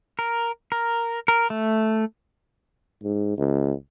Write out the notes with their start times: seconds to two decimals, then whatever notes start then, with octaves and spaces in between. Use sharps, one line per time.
0.19 A#4
0.72 A#4
1.28 A#4
1.50 A3
3.03 G#2
3.38 C#2